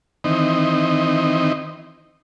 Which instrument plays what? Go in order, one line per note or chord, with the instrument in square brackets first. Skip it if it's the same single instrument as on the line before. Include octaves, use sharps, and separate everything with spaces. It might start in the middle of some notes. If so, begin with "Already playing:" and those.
[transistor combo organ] D#3 E3 C4 D#4